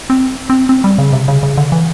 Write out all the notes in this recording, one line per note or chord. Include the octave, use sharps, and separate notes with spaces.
C4
C4
C4
G3
C#3
C3
C#3
C#3
D3
E3